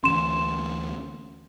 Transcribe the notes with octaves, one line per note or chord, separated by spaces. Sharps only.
D2 E3 C#4 C6 E7